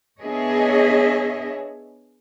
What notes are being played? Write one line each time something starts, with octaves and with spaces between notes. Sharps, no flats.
B3 D4 G#4 C#5 D#5 E5